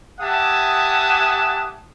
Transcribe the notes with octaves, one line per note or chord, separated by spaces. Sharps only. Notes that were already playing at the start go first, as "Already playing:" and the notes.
G4 E5 F#5 G#5 A5 D#6